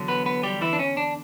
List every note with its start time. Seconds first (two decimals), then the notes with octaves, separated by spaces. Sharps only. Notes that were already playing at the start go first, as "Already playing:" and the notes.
Already playing: E2 D3 F#3
0.08 B3 B4
0.26 B3 B4
0.43 G3 G4
0.61 E3 E4
0.73 D4
0.79 C#4
0.97 D4